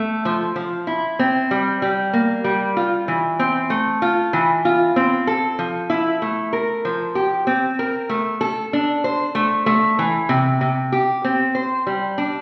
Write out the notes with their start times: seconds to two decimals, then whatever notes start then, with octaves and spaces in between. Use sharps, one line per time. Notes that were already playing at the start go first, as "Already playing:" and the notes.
Already playing: A3
0.25 F3
0.56 F3
0.87 E4
1.19 C4
1.51 G3
1.82 G3
2.13 A#3
2.44 G3
2.77 F4
3.08 E3
3.39 C4
3.70 A3
4.02 F4
4.33 E3
4.65 F4
4.96 C4
5.27 A4
5.59 F3
5.90 E4
6.22 A3
6.53 A#4
6.85 F3
7.15 G4
7.47 C4
7.79 A#4
8.09 A3
8.41 A4
8.73 D4
9.04 C5
9.35 A3
9.66 A3
9.99 E3
10.29 C3
10.61 C3
10.92 G4
11.24 C4
11.55 C5
11.87 G3
12.18 D4